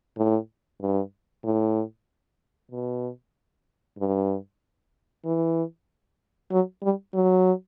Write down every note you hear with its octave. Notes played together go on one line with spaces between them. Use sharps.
A2
G2
A2
B2
G2
E3
F#3
G3
F#3